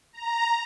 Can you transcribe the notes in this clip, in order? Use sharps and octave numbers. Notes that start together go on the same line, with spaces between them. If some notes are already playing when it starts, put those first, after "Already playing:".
A#5